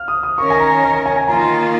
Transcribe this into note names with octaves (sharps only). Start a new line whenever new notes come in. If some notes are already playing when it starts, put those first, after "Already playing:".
Already playing: F5 F6
D#6
D#6
D#3 C#4 A#4 C#5 C#6
G#5
A#5
A#5
A#5
G#5
G#5
D#3 A#3 F4 A#5